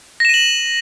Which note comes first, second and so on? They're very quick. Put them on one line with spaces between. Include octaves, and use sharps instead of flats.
A#6 E7 D#7 F#7